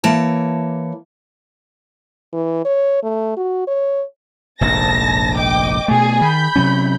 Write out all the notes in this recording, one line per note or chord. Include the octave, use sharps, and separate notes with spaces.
E3 A#3 C#5 A5
E3
C#5
A3
F#4
C#5
F1 A#1 G#2 A5 A#6
D#5 G5 D6
B2 A3 G#4
D#3 B5 G6
C3 F#3 C#4